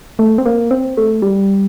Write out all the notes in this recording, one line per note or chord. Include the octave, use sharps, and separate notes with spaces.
A3
C4
A#3
C4
A3
G3